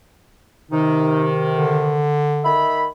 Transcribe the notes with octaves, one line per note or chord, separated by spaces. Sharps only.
C3 D#3 D#4
D3
D#3 E5 B5